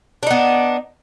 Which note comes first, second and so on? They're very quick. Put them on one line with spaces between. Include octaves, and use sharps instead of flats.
D4 D#4 B3